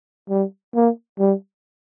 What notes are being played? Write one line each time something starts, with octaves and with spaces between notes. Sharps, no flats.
G3
A#3
G3